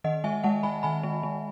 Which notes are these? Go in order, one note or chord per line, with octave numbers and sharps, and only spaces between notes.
D#3 D#5 F#5
G#3 E5 G#5
G#3 F#5 A5
G#3 G#5 B5
D#3 G#5 B5
G#3
G#3